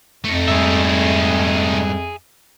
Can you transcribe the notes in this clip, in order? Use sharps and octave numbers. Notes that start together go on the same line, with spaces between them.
F2 A3 D#4
G#2 G3 G#4 E5